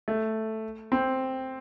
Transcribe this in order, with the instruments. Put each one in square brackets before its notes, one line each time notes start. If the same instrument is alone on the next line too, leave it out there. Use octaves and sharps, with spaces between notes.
[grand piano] A3
C4